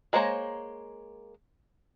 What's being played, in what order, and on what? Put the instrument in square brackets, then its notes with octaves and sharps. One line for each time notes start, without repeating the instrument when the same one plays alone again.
[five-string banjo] G#3 A#3 C5 C#5 A#5